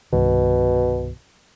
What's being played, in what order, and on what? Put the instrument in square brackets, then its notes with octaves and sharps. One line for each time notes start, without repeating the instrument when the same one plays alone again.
[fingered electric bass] C2 G2 D#3 [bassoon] B2